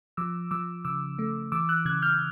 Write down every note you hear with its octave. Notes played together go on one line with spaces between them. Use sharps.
F3 D6 E6
F3 D6 E6
C#3 D6 E6
A3
E3 D6 E6
E6 F#6
C#3 F#6 G#6
F6 G6